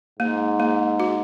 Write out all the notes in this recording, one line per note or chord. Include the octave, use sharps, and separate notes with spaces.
G#2 A#3
A#3
F#4